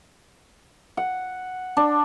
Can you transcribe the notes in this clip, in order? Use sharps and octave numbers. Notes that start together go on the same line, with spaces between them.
F#5
D4